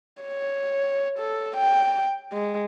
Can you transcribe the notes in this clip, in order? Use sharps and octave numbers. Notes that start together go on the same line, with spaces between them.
C#5
A4
G5
G#3